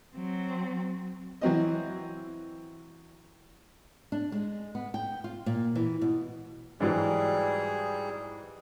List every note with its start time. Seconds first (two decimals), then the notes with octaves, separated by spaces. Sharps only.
0.15 F#3 C4
1.41 E3 F#3 C4 D#5
4.12 D4
4.32 G#3
4.75 B3
4.94 G5
5.24 F4
5.46 A#2
5.75 E3
6.01 B2
6.80 G#2 E3 F#3 G3 G#4